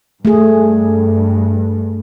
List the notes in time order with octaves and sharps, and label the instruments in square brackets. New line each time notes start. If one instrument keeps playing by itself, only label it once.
[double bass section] G2 [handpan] A3 G#4